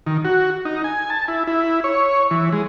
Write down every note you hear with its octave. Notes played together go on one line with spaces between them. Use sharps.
D#3
F#4
D#4
G#5
A5
E4
E4
C#5
E3
G#3